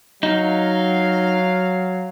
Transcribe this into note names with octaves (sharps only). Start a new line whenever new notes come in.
F#3 D#4 F5